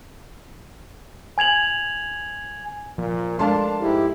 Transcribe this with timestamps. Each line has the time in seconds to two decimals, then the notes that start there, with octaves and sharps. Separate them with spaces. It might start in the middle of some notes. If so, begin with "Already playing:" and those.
1.38 G#5 G#6 F7 F#7
2.98 A#2 F3
3.39 G#3 D4 A4 A#4 F5 A5 C6
3.81 G#2 E4 G4